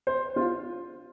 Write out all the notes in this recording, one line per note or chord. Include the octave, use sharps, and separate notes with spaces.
C5
F4